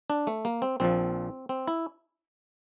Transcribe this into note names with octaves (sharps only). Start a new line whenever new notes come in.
D4
A3
A#3
C4
A#1 A#2 F3 C4
C4
E4